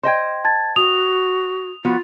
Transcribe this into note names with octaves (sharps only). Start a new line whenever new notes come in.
C5 D#5 G5 C6 G#6
A5 G#6 A6
F#4 D#6 F7
F3 B3 F4 F#4